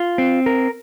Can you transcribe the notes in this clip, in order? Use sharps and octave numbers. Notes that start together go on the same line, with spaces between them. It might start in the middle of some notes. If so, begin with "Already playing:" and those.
Already playing: F4
C4
A#4